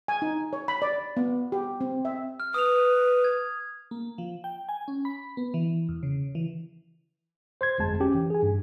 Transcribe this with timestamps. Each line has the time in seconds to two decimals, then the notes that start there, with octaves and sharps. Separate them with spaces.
0.08 G#5
0.22 D#4
0.53 C#5
0.68 B5
0.82 D5
1.17 B3
1.52 G4
1.81 C4
2.05 E5
2.40 F6
2.54 B4 D#6 F7
3.24 G#6
3.91 A#3
4.18 F3
4.44 G5
4.69 G#5
4.88 C#4
5.05 B5
5.37 B3
5.54 E3
5.89 E2
6.03 C#3
6.35 E3
7.61 C5 C6 G#6
7.78 G1 F2 G#3 A5
8.00 C#4 G4
8.14 E3
8.30 G#4 G#5
8.42 G2